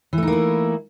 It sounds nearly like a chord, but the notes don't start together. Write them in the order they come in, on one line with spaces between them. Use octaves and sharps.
E3 A3 D#4 A#3 E4